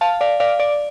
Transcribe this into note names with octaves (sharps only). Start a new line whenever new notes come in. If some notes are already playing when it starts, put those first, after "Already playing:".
F5 A5
D5 F5
D5 F5
D5